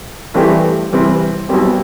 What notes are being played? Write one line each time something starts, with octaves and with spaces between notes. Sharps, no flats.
G2 E3 A3 C4 G4
C3 E3 G3 C4
B1 B2 G3 C4 G4